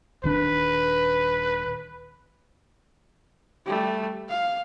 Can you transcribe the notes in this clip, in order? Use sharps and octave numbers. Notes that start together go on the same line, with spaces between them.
D#1 D#3 D4 B4
G3 A3
F5